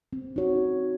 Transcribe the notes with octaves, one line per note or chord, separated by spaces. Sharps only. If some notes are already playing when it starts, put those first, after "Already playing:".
C4
D#4 F#4 C#5